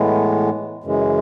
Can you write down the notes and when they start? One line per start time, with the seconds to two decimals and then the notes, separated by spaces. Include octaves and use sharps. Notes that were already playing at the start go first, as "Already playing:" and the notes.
Already playing: A2 E3 G#3 B3
0.84 F#2 C#3 E3 G#3